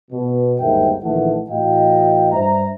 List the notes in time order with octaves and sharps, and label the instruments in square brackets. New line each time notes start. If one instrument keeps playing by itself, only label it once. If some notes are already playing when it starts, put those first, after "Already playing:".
[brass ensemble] B2
G1 D#2 G#2 A#4 E5 G5
A#1 D#3 E3 A3 E4 F#5
A2 E3 F#4 D#5 F5 G5
G2 D4 C5 E5 A#5